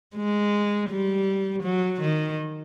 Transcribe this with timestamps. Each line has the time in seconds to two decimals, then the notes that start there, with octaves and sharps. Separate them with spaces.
0.17 G#3
0.90 G3
1.63 F#3
2.01 D#3